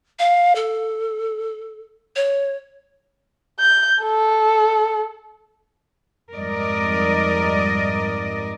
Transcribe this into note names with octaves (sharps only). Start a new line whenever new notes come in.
F5
A4
C#5
G6
A4
F2 G#2 G3 A#4 D5 D#5